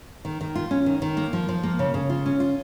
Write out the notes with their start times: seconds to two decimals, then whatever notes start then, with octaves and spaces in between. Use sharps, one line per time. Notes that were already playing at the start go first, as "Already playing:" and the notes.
0.25 D#3
0.41 D#3
0.55 F4
0.71 C#4
0.86 D#3
1.02 D#3
1.17 A#3
1.33 F3
1.49 F3
1.64 A#3
1.79 C#3
1.94 C#3
2.10 F4
2.26 C#4
2.40 F4